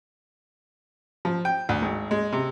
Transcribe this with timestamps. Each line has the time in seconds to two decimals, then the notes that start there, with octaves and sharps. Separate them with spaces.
1.25 F3
1.45 G5
1.69 D2
1.82 G#1
2.11 G#3
2.32 C3